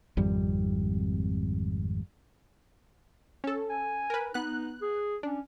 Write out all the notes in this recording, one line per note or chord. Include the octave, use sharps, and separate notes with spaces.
G#1 F2 G3
C#4 A4
G#5
A#4 B4
B3 D#4 F#6
G#4
C#4 D4